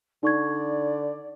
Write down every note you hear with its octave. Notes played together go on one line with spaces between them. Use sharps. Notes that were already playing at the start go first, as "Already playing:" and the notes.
D3 D#4 D5 C#6 G#6